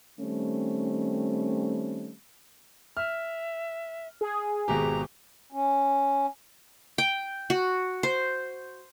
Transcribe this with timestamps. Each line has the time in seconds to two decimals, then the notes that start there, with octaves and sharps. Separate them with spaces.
0.20 D#3 G3 A3 C4 C#4
2.97 E5 F6
4.21 G#4
4.68 G#1 B2 G4 A#5
5.52 C#4
6.98 G5
7.50 F#4
8.03 C5